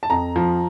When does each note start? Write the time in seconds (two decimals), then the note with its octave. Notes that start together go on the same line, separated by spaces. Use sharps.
0.03 A5
0.10 F2 A#5
0.36 F3